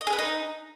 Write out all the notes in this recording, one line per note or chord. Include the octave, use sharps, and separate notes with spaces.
D#5
G#4
B4
D#4